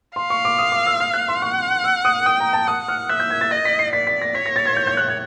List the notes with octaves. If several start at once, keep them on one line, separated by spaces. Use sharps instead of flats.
F5 C6
C#6
D6
D#6
D6
E6
F6
F#6
C6
F#5 C#6
E6
D#6
G5 D#6
A#5
A5
F#5 D#6
F6
E5 F#6
G6
G#6
A6
D#5 A#6
B6
C7
D5 B6
B6
A#6
C#5 B6
A#6
A6
G#6
G6
G6
F#6
G#6